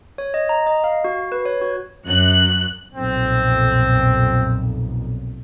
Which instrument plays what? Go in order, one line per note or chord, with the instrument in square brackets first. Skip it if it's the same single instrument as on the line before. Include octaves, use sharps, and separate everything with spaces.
[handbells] C#5
D#5
A#5
D#5
F5
F#4
B4
C#5
F#4
[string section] F#2 F#6
[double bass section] B1 F2 A#2 [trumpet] C4